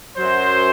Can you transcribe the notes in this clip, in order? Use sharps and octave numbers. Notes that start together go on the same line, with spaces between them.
F#2 F#3 C5